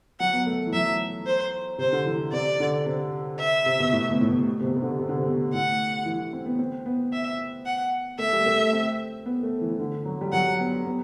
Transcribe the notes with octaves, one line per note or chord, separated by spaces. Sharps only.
F#3 F#5
B3
A3
E3
F#3 E5
C5
C3 C5
D3
E3
C3 D5
D3
C3
E5
C3
B2
A2
B2
A2
B2
C3
B2
C3
D3
C3
D3
C3
B2
A2 F#5
E3
C4
B3
C4
B3
E5
F#5
A3 E5
G3
A3
C4
B3
A3
E3
D3
F#3
G3
F#3 F#5
B3
B3